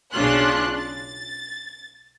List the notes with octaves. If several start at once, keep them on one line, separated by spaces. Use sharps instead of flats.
B1 C#3 D4 F4 C6 F#6
A6